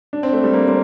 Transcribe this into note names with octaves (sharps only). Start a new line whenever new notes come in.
D4
C4
A3
G3
A#3
C4